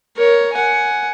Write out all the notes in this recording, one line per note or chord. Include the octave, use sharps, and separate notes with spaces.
A#4 C#5
F#5 G#5